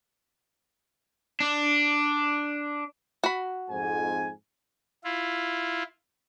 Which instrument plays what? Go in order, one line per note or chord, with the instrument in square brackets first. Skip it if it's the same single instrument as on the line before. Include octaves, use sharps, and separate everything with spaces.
[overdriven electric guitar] D4
[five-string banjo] F#4 B5
[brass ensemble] F2 G#2 G#5
[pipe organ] E4 F4